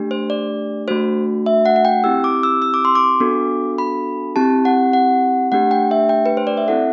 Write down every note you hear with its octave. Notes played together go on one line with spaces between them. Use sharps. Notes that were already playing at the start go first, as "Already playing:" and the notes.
Already playing: A3 D4 G4
C5
D5
A3 D4 F#4 C5
E5
F#5
F#5
G5
C4 E4 G4 E6
D6
E6
E6
D6
C6
D6
B3 D4 F#4 A4
B5
C4 E4 G4 A5
F#5
F#5
A3 D4 G4 F#5
G5
E5
G5
B4
C5
D5
E5
C4 E4 A4 F#5